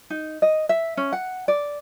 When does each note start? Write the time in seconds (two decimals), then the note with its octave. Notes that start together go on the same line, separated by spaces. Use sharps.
0.10 D#4
0.42 D#5
0.69 E5
0.97 C#4
1.13 F#5
1.48 D5